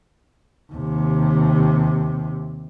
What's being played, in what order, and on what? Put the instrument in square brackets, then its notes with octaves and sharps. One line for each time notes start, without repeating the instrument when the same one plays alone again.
[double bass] D#2 C3